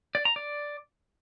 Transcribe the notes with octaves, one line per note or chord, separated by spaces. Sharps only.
D5
A#5
D5